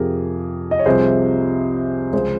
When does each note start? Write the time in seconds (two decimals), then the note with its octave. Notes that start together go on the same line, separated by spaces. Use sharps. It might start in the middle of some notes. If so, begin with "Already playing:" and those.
Already playing: F2 C3 F3 G4 G#4 A#4
0.71 D#5
0.79 C#5
0.86 C2 C3 F3 G#4 C5
2.12 C#2 C#3 F3 G#4 C5